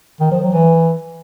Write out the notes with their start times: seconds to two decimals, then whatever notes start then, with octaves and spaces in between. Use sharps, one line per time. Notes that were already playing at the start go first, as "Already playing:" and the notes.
0.20 D#3
0.31 F3
0.42 F#3
0.53 E3